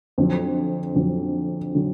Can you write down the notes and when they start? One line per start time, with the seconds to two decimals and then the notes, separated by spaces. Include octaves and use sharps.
0.18 F2 D3 F#3
0.95 F2 D3 F#3
1.75 D3 F#3